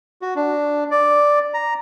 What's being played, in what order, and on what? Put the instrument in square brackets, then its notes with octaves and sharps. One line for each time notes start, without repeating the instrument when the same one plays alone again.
[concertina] F#4
D4
D5
A#5